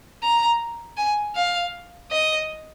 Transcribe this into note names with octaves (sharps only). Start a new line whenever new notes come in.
A#5
G#5
F5
D#5